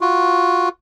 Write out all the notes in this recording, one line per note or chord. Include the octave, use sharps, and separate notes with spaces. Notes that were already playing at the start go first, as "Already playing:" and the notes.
F4 F#4